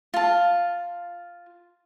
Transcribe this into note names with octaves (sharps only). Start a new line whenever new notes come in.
F4 A5